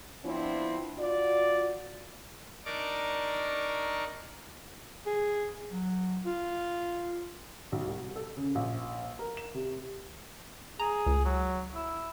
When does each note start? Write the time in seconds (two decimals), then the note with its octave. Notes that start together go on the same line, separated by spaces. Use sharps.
0.25 F3 B3 C4 D4 E4
0.99 F4 F#4 D5
2.65 D4 D#4 A#4 D5 C#6 D6
5.06 G#4
5.70 F#3
6.26 F4
7.72 B1
7.87 C2
8.16 A4
8.37 C#3
8.55 A#1
9.19 A#4
9.37 E7
9.54 C3
10.80 G#4 A#5
11.06 C#2
11.25 F#3
11.74 E4